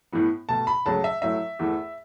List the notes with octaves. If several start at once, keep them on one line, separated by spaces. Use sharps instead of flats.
A2 E3 B3
B2 A3 A5
B5
C#2 C#3 F#3 A3 A5
E5
A2 F#3 A3 E5
E2 E3 A3